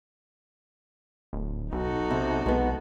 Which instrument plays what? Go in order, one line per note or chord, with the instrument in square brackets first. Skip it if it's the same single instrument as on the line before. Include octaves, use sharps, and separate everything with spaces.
[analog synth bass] D1
[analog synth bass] B1 [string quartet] D#4 F#4 A4
[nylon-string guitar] C3
[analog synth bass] B1 [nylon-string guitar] G#3 B3